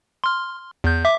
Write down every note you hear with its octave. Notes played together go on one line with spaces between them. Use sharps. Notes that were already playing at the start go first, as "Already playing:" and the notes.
C6 F6
E2 G6
E5 D6